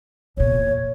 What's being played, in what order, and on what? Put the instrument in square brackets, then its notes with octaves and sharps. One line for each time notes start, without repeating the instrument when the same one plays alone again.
[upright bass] E2 A#2 [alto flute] C#5